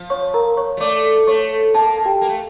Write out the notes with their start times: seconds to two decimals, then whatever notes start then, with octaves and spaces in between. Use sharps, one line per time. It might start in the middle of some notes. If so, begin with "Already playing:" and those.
Already playing: F3
0.10 C#5 C#6
0.34 A#4 A#5
0.57 C#5 C#6
0.77 G3
0.80 A3 D5 D6
1.27 A3 C#5 C#6
1.74 A#3 A4 A5
1.98 A5
2.05 G4 G5
2.21 A#3
2.29 A3